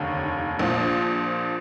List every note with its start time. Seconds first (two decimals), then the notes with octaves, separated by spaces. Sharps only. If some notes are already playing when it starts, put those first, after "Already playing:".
Already playing: F1 D#2 D3
0.59 A#1 A#2 F3